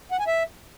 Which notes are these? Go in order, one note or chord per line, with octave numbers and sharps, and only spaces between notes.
F#5
G#5
E5